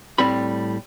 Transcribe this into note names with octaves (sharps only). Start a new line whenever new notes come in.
A2 G3 C4 B5